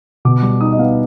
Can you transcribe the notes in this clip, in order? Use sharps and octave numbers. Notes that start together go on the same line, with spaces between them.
B2 D6
G3 D6
D#4 D#6
D#5
B3 F5